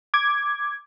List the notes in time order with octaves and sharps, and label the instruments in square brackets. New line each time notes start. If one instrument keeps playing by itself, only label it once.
[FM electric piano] D6 G#6